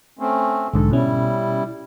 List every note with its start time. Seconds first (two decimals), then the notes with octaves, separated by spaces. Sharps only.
0.19 A3 C4 C#4
0.74 B1 G#2 D3 A4
0.91 B2 G3 C#4 E4